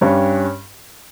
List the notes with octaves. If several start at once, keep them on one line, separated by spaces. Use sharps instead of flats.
G2 G3 C#4